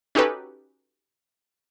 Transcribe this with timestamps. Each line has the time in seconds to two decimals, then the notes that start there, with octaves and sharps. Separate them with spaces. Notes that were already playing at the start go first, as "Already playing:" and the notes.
0.15 C#4 D#4 F#4 G4 A4 B4